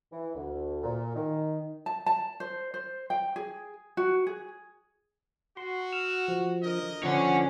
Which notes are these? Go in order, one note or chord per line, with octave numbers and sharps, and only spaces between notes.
E3
D2
A#2
D#3
A5
A5
C5
C5
G5
G#4
F#4
G#4
F#4 C6
E6 F6
F3
D3 A#4 D#5
D3 F3 C#4 C#5 F#5 G#5